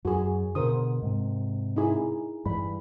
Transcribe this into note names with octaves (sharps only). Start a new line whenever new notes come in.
F#2 F#4 G#4
B2 D3 A#4 C5 D#6
G#2 C3
D#4 E4 G#4
G2 E3 B5